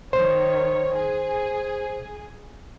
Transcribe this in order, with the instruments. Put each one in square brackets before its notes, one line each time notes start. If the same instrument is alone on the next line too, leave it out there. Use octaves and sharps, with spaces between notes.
[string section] D#3 C#5 [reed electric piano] C5
[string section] G#4